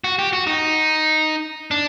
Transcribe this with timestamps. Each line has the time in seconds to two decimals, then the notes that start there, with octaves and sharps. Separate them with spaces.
0.04 F#4
0.19 G4
0.33 F#4
0.47 D#4
1.71 D4